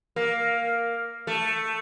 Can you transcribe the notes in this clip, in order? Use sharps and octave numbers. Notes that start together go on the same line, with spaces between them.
A#3
A3